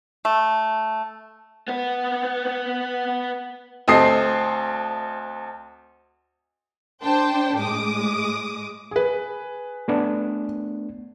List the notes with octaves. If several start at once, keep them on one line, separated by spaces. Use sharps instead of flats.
A3
B3 B4
D2 C4 A4 D#5 D#6 C7
D4 C5 G5 A5
A2 G#3 D6 D#6
G#4 B4
A3 B3 D4